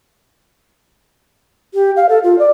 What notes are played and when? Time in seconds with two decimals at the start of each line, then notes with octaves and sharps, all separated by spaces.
1.74 G4
1.96 F5
2.09 A4
2.23 F4
2.39 D5